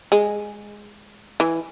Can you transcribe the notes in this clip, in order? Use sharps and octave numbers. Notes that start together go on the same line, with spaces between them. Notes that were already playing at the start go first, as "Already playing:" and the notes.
G#3
E3